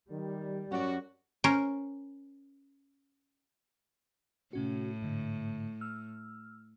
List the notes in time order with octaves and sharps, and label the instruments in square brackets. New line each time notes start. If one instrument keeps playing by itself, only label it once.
[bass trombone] D#3 [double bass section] G3
[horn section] F#2 F#4 [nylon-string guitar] C#4 D5
[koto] C#4 A#4 C5
[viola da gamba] A2 [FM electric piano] C3 C#4 F#4
[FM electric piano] G#2 D3
E6 F6